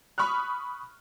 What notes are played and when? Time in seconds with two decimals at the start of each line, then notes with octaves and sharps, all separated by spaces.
0.18 B5 C#6 D#6 F6 F#6